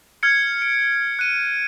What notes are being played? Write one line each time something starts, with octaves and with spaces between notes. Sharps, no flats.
F6 G#6 C#7
D7
F#6 D#7